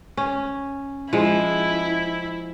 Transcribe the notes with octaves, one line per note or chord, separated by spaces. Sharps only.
C#4
F3 G#3 E4